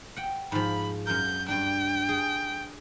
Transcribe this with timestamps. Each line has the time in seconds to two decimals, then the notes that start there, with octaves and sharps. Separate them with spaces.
0.16 F#5 G5
0.52 G#2 F3 B5
1.07 F#2 A#4 G6
1.48 G2 D4 G5
2.09 G#4